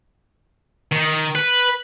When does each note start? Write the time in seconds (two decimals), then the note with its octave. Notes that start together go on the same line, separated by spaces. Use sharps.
0.92 D#3
1.35 B4